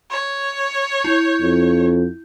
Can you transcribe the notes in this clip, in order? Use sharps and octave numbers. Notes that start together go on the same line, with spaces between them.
C#5
E4
F2